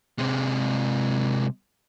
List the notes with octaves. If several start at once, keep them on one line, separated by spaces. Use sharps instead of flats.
C3 G#3